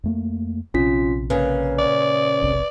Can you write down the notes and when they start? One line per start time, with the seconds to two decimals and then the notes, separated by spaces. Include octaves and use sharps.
0.04 F2 A3 A#3
0.74 A#1 C3 C#4 F4 B6
1.30 A#2 C#3 B4
1.79 D5
2.42 F1 B1 C3